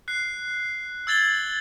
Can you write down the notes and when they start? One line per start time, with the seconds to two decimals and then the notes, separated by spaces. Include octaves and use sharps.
0.08 F#6 C7
1.07 E6 G#6 A6 F#7 G7